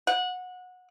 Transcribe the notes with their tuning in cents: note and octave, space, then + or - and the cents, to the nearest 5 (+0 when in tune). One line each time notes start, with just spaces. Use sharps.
F#5 -20